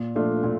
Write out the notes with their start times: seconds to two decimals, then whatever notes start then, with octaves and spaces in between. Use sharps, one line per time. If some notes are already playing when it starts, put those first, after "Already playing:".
Already playing: A#2
0.15 F3 A3 D4 F4
0.43 A#2